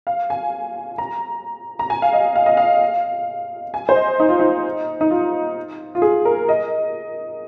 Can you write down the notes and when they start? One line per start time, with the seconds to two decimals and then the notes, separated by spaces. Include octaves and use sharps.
0.07 F5
0.30 G#5
0.98 A#5
1.79 A#5
1.90 G#5
2.02 F5
2.13 D#5
2.36 F5
2.46 D#5
2.57 F5
3.74 G#5
3.89 C5
3.96 D#5
4.20 D#4
4.29 F4
4.40 D#4
5.01 D#4
5.10 F4
5.95 F4
6.02 G#4
6.25 A#4
6.49 D#5